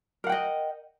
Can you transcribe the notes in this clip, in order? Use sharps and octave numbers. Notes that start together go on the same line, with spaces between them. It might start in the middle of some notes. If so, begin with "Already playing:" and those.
A#4 D#5 F#5 G5